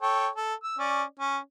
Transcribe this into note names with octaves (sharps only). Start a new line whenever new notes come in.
A4 C#5 G5
A4
E6
C#4 D5
C#4